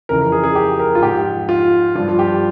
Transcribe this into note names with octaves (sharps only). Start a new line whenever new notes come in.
F2 C#3 E3 A#4
A#4
G#4
G#4
G4
A#4
F4
G#2 F3 G4
F4
G2 F3 F4
F4
G4